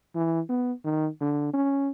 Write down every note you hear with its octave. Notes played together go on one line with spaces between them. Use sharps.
E3
B3
D#3
D3
C#4